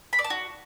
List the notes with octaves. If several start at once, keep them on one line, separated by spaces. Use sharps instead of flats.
B5
D5
A5
F#4